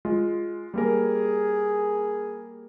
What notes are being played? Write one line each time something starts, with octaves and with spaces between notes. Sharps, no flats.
G#3 F4
G3 A#3 G#4 A#4